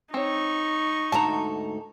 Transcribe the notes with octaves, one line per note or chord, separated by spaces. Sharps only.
C4 D#4 C#5 C#6
D2 G#2 A4 A5 A#5